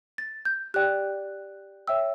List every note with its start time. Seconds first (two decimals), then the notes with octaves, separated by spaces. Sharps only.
0.18 A6
0.45 G6
0.74 G4 D5 G5 F#6
1.88 C#5 E5 G5 E6